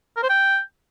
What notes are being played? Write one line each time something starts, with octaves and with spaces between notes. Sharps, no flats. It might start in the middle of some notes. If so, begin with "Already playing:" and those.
A#4
C5
G5